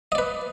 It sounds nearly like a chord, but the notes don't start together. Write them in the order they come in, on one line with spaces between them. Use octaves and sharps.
D#5 D5 B4